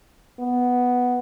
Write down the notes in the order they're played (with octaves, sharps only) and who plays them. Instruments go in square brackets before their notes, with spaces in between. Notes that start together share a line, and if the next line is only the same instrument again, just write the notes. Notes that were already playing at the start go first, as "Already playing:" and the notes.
[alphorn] B3